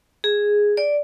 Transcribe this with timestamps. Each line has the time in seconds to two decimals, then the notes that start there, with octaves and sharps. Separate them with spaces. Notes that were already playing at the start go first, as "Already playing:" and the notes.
0.24 G#4
0.77 D5